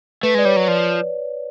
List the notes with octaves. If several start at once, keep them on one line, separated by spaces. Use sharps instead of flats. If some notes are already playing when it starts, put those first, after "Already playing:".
A3 B4
G#3 D5
G3 C#5
F#3
F3 D5